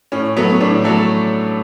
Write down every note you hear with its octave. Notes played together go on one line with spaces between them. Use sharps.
A2 C#4
F#3 A3 B3
B3
A2 D4
F#3 A3 A4